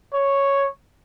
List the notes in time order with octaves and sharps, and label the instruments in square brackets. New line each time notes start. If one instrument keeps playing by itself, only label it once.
[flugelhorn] C#5